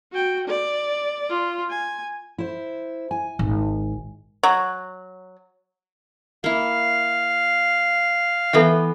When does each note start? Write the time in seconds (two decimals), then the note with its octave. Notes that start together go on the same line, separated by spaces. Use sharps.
0.12 F#4 G5
0.47 D5
1.30 F4
1.70 G#5
2.38 E4 C5
3.11 G#5
3.39 G#1
4.43 F#3
6.44 A#3 E4 F5
8.53 E3 B3 E4 A4 E5 G5